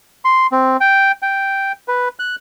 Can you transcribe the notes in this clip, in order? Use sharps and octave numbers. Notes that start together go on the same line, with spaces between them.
C6
C4
G5
G5
B4
F#6